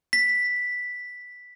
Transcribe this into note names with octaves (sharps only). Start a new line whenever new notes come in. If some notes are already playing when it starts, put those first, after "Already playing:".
B6